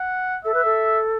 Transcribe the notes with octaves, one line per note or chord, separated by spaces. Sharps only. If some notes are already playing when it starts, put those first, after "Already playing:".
Already playing: F#5
A4 E5
B4
A4